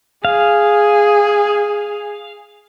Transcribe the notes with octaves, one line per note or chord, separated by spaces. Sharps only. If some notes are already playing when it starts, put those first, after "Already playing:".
G#4 F5